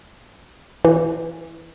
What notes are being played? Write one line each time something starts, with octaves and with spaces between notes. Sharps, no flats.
E3